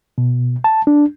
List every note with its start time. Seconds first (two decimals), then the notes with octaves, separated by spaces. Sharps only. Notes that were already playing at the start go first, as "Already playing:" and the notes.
0.18 B2
0.64 A5
0.87 D4